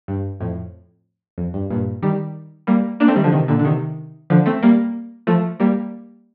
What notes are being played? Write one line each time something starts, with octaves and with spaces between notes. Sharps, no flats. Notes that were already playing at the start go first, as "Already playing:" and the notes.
G2
F2 A2
F2
G2
G2 A#2
D#3 G3
G3 A#3
A#3 D4
A3 C4
D#3 G3
D3 F3
C3 D#3
A#2 D3
D3
C3 D#3
D3 F3
A3 C4
G3 A#3
F3 A3
G3 A#3